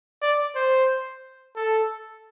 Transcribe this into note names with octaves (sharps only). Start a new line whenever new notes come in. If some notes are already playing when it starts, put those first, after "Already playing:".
D5
C5
A4